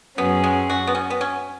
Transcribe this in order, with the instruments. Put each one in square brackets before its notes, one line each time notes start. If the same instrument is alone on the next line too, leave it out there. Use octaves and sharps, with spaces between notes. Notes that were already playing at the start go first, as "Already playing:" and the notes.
[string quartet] F#2 F#3 C#4 G#4 [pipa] B3
[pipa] G#3
F#4
B3
C#4
B3
C#4